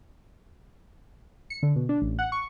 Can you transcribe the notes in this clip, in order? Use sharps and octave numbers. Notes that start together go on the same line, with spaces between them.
C#7
D3
B2
D4
A1
F#5
C#6